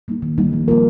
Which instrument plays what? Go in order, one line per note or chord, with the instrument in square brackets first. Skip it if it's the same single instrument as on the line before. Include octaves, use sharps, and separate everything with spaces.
[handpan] G3 A#3 D#4
D#3
G3 A#3 D#4
F3
A#3 F4 A#4